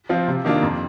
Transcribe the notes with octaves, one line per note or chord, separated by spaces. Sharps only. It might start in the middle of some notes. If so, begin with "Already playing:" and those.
F3 C4 F4
C3
D#3 A#3 D4 F4
F2